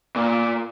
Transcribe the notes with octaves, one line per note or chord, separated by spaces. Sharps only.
A#2